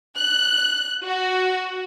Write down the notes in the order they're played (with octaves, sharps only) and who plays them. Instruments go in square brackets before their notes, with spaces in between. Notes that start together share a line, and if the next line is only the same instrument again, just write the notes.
[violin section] F#6
F#4